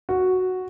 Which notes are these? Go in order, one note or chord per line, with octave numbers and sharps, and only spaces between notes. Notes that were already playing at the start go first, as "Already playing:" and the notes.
F#4